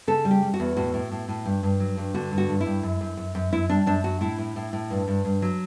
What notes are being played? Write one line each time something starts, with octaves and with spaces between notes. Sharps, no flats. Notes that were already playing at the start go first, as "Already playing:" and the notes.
C#3 A4
G3
G4
G3
F#4
E2
A2 F#4
A2
A2
A2
G2
G2
F#3
G2
D3 F#4
G2
F#4
G2
E4
G2
F#2
F#2
F#2
F#2
F#2 E4
G3 D4
F#2 D4
F#2 F#4
A2 E4
A2
A2
A2
G2
G2
G2
F#3